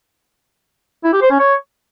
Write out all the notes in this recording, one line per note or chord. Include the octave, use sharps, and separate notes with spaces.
E4
G4
C5
C#4
C#5